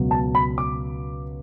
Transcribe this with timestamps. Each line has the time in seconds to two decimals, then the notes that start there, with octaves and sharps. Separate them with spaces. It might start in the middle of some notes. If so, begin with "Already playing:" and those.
Already playing: C#2 B2 F#3
0.11 A5
0.35 B5
0.58 D6